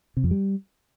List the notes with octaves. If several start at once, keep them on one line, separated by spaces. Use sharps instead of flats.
C3
F2
G3